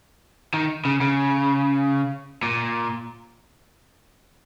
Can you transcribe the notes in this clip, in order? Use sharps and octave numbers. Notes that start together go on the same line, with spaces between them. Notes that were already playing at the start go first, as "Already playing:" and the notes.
D#3
C#3
C#3
A#2